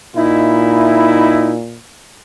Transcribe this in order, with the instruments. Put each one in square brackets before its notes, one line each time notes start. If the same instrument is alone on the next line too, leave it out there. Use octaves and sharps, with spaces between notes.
[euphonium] A#2 [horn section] D#4 E4